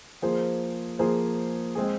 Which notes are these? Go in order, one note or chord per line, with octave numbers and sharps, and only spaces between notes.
F3 A#3 G#4 C5
F3 A#3 G#4 C5
G#3 C4 G#4